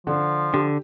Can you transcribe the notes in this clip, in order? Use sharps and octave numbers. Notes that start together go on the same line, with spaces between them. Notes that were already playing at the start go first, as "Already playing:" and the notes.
D3 F3
D3 G4